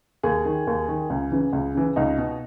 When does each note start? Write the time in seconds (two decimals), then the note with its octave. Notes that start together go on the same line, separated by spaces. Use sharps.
0.23 D#2 G#4
0.45 D#3
0.67 D#2
0.88 D#3
1.10 C#2
1.32 C#3 E3
1.53 C#2
1.75 C#3 E3
1.96 C#2 D#4
2.18 B2